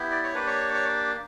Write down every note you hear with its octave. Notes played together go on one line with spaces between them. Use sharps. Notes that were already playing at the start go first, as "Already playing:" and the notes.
Already playing: B3 E4 G4
D5
C#5
A#3 D4 G4 B4
C#5
C#5